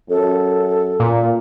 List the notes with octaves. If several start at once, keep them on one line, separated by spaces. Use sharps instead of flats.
F#2 A4
A#2